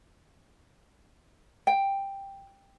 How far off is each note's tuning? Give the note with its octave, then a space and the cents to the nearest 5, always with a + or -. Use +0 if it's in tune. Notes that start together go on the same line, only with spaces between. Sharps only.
G5 +5